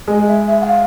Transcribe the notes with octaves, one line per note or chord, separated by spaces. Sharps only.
G#3 D#5
E5
E5
F#5
F5